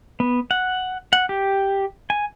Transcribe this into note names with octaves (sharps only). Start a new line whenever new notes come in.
B3
F#5
F#5
G4
G#5